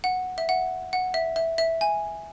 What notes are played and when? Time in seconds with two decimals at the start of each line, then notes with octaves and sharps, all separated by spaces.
0.04 F#5
0.38 E5
0.49 F#5
0.93 F#5
1.14 E5
1.36 E5
1.58 E5
1.81 G#5